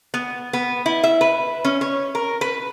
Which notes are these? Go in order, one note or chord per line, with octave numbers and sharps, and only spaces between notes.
B3
B3
E4
E5
B4
C#4
C#5
A#4
B4